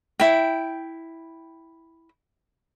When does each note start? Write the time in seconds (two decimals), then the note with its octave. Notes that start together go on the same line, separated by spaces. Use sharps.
0.20 E4 G5